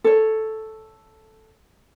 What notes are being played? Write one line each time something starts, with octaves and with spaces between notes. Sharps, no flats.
A4 C#5